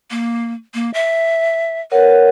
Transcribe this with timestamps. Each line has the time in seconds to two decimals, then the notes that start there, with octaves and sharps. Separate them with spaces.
0.11 A#3
0.74 A#3
0.94 E5
1.92 A#4 B4 C#5 F#5